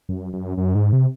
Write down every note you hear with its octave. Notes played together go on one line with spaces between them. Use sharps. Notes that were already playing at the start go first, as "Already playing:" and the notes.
F#2
F#2
F#2
G#2
C3